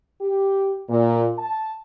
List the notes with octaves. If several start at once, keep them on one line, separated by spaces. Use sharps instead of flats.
G4
A#2
A5